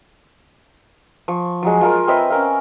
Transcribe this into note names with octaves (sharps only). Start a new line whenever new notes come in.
F3 C#6
F3 F#3 G#3
F3 F4 A#4
C4 B4 D#5 E5
C#4 A#4 F5